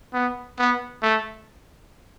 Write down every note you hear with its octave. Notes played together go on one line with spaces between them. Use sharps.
B3
B3
A3